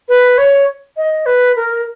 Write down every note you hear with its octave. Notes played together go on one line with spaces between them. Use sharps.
B4
C#5
D#5
B4
A#4